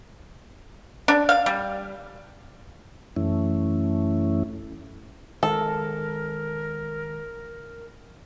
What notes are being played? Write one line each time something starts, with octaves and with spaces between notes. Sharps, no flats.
D4
F5
G3
F#2 E3 A3 C#4 E4
D#3 G#3 A4 A#4